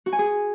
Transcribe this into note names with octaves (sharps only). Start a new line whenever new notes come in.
F#4
G#5
G#4